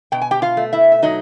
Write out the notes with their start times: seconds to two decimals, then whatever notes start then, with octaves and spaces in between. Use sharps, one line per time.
0.12 B2 G5
0.22 G#5
0.31 G4 G5
0.42 F4 F5
0.57 A3
0.73 E4 E5
0.92 E5
1.02 F#3 D#4 D#5